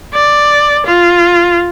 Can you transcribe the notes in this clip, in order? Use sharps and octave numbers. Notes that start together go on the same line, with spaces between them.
D5
F4